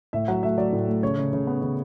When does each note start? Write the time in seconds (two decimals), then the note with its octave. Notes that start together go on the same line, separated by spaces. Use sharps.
0.13 A2 E5
0.28 F#3 F#5
0.43 A3 E5
0.58 F#3 D5
0.72 A2
0.87 A3
1.03 C#3 C#5
1.17 C#3
1.33 C#3
1.47 B3
1.62 C#3